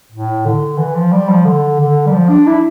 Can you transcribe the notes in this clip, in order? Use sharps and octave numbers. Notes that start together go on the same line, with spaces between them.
A2
D3
E3
F3
G3
F3
D3
D3
G3
F3
D4
E4